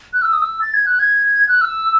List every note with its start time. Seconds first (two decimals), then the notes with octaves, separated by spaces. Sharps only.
0.13 F#6
0.22 E6
0.33 D#6
0.42 E6
0.61 A6
0.74 G#6
0.86 F#6
0.99 G#6
1.48 F#6
1.61 E6